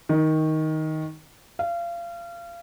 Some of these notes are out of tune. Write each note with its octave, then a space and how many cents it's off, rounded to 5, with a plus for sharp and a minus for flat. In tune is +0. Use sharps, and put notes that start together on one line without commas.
D#3 +10
F5 -30